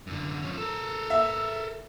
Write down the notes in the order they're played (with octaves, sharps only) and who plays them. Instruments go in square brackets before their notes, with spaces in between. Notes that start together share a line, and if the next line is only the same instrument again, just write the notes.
[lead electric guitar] F#2 D3
F3 C#4
A4 A#4
[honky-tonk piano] E5